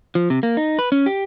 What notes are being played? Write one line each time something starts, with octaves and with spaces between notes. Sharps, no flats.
F3
C3
A#3
D#4
B4
C#4
G4